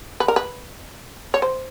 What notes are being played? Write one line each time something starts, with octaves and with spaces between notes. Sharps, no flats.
B4
A#4
B4
C#5
C5